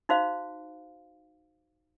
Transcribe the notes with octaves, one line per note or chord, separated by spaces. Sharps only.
D#4 F#4 C5 F5